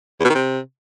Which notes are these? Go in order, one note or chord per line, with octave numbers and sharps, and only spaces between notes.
E2
B2
D#3
C3